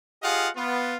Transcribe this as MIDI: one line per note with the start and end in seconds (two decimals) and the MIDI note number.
0.23 0.49 65
0.23 0.49 67
0.23 0.49 68
0.23 0.49 75
0.23 0.49 77
0.23 0.49 78
0.56 0.96 59
0.56 0.96 65